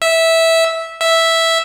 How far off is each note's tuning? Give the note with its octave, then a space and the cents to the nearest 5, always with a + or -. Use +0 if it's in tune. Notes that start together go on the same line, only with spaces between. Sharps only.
E5 -10
E5 -5